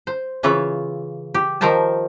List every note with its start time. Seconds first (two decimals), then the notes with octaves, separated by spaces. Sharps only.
0.07 C5
0.43 C#3 E3 F4 C#5 E5
1.34 G4
1.61 D#3 F3 A#4 C5 E5 A5